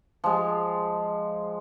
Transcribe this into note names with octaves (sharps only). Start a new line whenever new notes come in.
F3 G#3